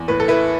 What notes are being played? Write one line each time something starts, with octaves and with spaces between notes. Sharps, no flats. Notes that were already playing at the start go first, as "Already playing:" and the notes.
Already playing: E2
A2 B4
A4
E4 B4